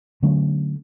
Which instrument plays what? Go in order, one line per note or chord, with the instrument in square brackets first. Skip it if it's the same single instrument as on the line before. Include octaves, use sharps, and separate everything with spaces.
[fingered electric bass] D3 F#3 A3 C#4